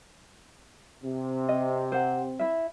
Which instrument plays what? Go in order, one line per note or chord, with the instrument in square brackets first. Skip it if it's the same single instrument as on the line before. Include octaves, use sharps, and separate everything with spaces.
[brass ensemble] C3
[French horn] C4 [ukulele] D#5
[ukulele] C5 F#5
E4 E5